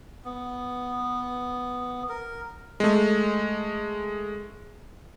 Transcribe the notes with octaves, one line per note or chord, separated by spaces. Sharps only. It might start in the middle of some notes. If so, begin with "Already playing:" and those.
B3
A#4
G#3 A3